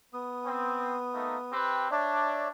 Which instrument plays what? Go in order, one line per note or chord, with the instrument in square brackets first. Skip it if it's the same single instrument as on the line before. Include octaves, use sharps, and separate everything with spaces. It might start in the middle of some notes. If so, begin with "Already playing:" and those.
[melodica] B3 D#6
[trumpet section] C4
A3 A#3 D#4
C4 G4 B4
[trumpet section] D4 [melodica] C#5 D5 E5